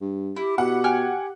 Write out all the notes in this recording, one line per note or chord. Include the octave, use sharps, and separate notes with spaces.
G2
E4 G4
B2 G4 F#5
G5 G#5 F6